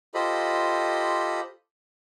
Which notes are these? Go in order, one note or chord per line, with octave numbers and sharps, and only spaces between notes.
F4 G4 A4 C5 D#5 B5